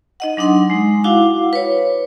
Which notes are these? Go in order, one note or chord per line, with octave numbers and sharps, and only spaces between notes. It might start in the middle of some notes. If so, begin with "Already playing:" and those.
D#4 D#5 F#5
F#3 D4 D#4 F#5 C6
G#3 D#4
E4 F#4 F5 F#5 D6
B4 C#5